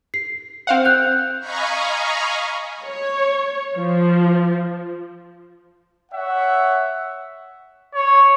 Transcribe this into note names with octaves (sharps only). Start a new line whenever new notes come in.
C7
C4 F5 F#5
F#6 G6 F7
D#5 F5 G#5 A#5 B5 C#6
C#5
F3
C#5 E5 F#5
C#5